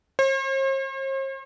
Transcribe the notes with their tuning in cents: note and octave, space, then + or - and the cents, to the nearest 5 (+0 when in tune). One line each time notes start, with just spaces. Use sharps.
C5 +45